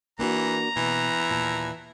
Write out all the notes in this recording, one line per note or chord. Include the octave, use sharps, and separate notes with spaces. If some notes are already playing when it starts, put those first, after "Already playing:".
E3 A#3 D4 F#4 A#5
B2 E3
D#2 A#2 A5